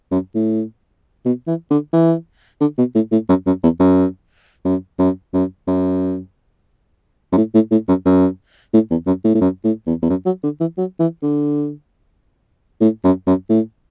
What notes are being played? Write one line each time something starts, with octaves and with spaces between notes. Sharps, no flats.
F#2
A2
B2
E3
D3
E3
D3
B2
A2
A2
F#2
F#2
E2
F#2
F#2
F#2
F#2
F#2
F#2
A2
A2
A2
F#2
F#2
A2
E2
F#2
A2
A2
F#2
A2
E2
E2
F#2
F#3
D3
E3
F#3
E3
D3
A2
F#2
F#2
A2